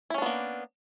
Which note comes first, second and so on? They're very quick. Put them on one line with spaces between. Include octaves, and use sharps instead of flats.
E4 C#4 D4 B3 A#3